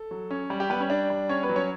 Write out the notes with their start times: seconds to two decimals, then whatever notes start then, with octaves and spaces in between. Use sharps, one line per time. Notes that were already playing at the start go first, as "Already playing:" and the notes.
Already playing: A4
0.11 F#3
0.30 C#4
0.50 G3
0.60 G4
0.70 G3 B3 B4
0.80 C#4 C#5
0.90 D4 D5
1.10 G3
1.29 C#4 C#5
1.43 B3 B4
1.49 F#3
1.56 C#4 C#5